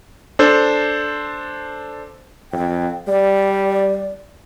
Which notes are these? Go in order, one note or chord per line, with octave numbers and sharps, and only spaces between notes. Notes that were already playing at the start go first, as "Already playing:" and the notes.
D4 A4 C5
F2 G5
G3 D5